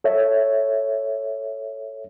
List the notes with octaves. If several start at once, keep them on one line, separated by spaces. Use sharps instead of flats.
A4 C#5 E5